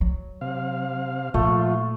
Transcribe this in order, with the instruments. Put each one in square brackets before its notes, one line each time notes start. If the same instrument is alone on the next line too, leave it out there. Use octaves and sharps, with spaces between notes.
[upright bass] F#3
[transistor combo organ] C3 F5
[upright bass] A#2 [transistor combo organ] F3 F4 [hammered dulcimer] A3